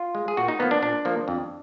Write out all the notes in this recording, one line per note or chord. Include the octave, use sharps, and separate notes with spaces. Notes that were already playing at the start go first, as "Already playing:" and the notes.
Already playing: F4
G#3
G#4
A#2 F#4
D#4
F3 A#3 B3
D4
A#2 D4
F3 A#3
F2